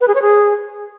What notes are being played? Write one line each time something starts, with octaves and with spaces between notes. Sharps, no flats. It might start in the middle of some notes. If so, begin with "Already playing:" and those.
B4
G#4
C#5
G#4